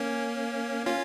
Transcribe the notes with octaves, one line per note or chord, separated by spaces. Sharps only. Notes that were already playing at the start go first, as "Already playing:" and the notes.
Already playing: A#3 C#4
C#4 F4